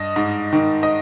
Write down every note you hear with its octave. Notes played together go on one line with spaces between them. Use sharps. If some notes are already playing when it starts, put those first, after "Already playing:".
Already playing: G2 D#5
G#2
D#3
D#5